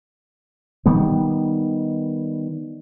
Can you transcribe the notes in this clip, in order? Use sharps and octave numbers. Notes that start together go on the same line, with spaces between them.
D#3 G3 B3